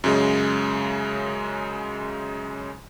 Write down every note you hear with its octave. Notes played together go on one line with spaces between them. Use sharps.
F#2 C#3 G#3